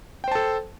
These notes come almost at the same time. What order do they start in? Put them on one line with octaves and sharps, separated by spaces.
G5 C5 A5 A4